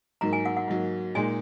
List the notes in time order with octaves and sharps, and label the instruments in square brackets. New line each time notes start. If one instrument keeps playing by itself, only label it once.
[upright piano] G#2 F#3 A#3 [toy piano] A#5
[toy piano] G#5
F#5
F#5
[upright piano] G#2 F#3 A#3
[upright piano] A#2 G#3 D#4 [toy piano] G#5